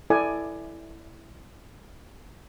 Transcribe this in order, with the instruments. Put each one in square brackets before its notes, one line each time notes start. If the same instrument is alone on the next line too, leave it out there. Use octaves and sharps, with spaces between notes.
[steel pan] E4 A4 D5 G#5